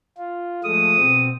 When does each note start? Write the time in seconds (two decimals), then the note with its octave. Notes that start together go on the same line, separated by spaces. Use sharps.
0.18 F4
0.64 F3 G#3 A3 D#6
0.97 B2 C4